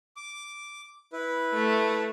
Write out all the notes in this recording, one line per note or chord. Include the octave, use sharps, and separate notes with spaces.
D6
E4 B4
A3